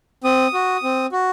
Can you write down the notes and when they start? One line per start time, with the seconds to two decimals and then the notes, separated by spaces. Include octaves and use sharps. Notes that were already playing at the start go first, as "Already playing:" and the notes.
0.24 C4 D#6
0.54 F#4
0.83 C4
1.12 F#4